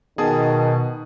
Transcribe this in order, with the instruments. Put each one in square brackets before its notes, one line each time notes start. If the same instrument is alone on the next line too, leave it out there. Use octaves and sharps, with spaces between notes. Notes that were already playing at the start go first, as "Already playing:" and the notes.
[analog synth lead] B2 [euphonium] D#3 [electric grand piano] G#4 A5 D#6